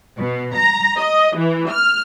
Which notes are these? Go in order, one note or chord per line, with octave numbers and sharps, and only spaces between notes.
B2
A#5
D#5
E3
F6